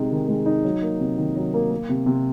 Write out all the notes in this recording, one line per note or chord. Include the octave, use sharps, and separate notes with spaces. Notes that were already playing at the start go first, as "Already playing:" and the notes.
Already playing: C3 G#3 D#4
D#3
G#3
D#4
F#3
A#3
C3
D#3
F#3
A#3
A#3
C3
C3